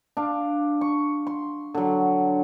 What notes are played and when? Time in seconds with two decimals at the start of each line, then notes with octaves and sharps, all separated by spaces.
0.17 D4 F5
0.81 C#6
1.27 C6
1.75 D3 F#3